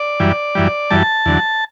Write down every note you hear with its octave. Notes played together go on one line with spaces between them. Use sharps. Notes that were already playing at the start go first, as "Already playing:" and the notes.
Already playing: D5
F#2 E3 G3
F#2 E3 G3
F#2 E3 G3 A5
E2 D3 F#3